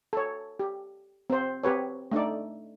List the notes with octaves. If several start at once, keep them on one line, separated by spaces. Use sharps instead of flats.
A4 C#5
G4
C4 C5
C4 G4 B4 C#5
A3 D4 D#4 D5